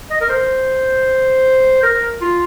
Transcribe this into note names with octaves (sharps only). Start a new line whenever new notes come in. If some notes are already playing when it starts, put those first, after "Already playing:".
D#5
A#4
C5
A#4
F4